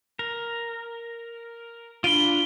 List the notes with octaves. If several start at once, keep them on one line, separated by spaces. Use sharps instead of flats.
A#4
D4 F4 F5 B5 D7 D#7 G7